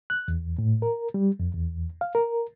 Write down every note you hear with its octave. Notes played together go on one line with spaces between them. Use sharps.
F#6
E2
A2
A#4
G3
F2
E2
F5
A#4